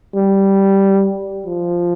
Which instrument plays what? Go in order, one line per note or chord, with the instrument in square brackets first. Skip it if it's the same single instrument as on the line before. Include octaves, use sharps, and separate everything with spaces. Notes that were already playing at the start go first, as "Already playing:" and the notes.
[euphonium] G3
F3